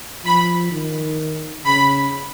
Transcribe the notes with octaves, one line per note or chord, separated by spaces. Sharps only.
F3 B5
D#3
C#3 B5